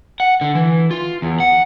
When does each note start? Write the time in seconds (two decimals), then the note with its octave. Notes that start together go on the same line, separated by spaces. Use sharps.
0.20 F#5
0.41 D3
0.55 E3
0.91 F4
1.22 E2
1.40 F#5